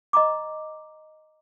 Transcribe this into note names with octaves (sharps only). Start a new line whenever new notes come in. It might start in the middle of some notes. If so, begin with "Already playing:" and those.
D#5 A#5 D6